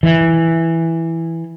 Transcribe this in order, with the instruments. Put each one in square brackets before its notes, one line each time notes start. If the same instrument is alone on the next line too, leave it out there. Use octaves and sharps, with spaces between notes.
[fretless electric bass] E3